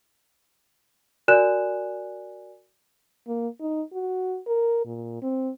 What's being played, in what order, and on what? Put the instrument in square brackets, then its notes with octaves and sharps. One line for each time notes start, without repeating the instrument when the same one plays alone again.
[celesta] F#4 A#4 D5 G#5 F#6 E7
[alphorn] A#3
D#4
F#4
A#4
A#2
C4